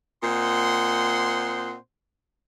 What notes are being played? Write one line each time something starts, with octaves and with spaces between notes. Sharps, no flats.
A#2 C4 C5 D#5 F#5 C6